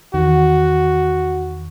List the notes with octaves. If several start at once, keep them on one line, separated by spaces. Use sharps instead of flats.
E2 D#3 F#4